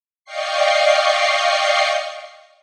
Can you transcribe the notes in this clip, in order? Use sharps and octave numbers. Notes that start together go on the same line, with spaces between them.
D5 D#5 F5 G5 C#6 C7